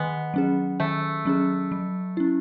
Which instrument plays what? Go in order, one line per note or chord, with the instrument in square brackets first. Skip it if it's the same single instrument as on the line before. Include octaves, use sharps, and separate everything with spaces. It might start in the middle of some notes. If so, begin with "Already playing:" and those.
Already playing: [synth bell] D#3 [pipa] G#3 B3
[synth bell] F#3 C#4 G#4
[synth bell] D#3 [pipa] A3
[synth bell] F#3 C#4 G#4
F#3
C#4 E4